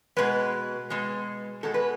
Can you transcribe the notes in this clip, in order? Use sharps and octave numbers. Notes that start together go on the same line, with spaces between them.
B2 G#3 B4
B2 G#3
B2 G#3 A4
B4